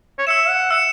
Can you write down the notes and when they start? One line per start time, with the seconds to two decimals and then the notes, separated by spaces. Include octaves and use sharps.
0.18 C#5
0.27 E5 E6 C#7 E7
0.49 F#5
0.70 E5 E6 C#7 E7